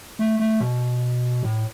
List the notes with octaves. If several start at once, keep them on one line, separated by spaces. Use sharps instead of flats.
A3
A3
B2
A2